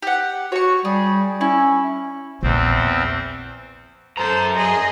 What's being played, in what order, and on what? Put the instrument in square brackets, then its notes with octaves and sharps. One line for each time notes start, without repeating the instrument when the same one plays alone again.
[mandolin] G4 F#5
[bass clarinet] F#4 [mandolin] C#5 C#6
[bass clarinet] G3 [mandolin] G#4
[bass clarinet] C#4 [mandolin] E4
[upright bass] A#1 [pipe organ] E2 C4
[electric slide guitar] F#2 A#5 [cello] A4 C5
[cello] G#4 D#5